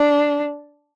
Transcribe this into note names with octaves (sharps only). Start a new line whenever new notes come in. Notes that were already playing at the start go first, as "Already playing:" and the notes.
Already playing: D4